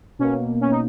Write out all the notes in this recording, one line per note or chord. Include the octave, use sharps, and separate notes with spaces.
B2 A#3 C#4
C#4
D#4